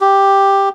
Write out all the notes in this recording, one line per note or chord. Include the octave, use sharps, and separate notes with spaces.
G4